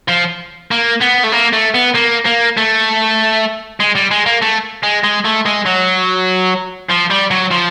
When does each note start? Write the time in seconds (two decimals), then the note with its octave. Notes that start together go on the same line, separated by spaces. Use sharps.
0.09 F3
0.71 A#3
1.02 B3
1.24 A3
1.33 A#3
1.53 A3
1.75 B3
1.95 A#3
2.26 A#3
2.57 A3
3.80 G#3
3.95 G3
4.11 G#3
4.26 A#3
4.42 A3
4.83 G#3
5.04 G#3
5.25 A3
5.45 G#3
5.66 F#3
6.89 F3
7.10 G3
7.31 F#3
7.51 F3